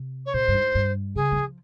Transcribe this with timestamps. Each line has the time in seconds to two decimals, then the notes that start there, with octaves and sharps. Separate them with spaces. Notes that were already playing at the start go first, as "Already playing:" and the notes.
Already playing: C3
0.25 C#5
0.34 A#2 C5
0.48 G2
0.54 G#2
0.75 G2
1.15 C#3 G#4
1.31 G3
1.36 F3